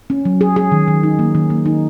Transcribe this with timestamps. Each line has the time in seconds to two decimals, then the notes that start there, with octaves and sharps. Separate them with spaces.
0.10 C#4
0.25 F#3
0.41 G#4
0.56 G#4
0.72 D#3
0.88 D#3
1.03 D#4
1.19 A#3
1.35 D#3
1.50 A#3
1.66 D#4